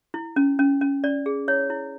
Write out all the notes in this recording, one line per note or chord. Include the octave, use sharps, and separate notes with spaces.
E4
C#4
C#4
C#4
C#4 D5
G#4
E4 C#5
E4